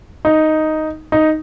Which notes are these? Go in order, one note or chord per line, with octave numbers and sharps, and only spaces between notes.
D#4
D#4